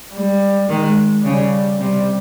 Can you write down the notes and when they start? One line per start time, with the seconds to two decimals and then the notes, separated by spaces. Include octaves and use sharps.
0.14 G3
0.69 D#3 G#3
1.25 C#3 G3
1.79 C3 G3